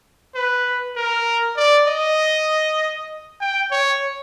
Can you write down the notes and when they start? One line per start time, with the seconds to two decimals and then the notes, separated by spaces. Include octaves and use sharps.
0.35 B4
0.96 A#4
1.57 D5
1.87 D#5
3.41 G5
3.72 C#5